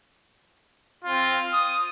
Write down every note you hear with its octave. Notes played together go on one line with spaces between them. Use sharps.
C4 F4
D#6